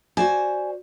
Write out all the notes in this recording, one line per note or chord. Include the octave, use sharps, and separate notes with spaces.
F#4 C5 D5 G#5